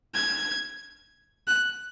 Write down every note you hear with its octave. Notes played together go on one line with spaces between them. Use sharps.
G#6
F#6